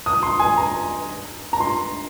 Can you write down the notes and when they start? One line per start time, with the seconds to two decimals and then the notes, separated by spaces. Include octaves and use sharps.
0.06 D#6
0.23 C6
0.40 G#5
0.57 A#5
1.53 A#5
1.60 C6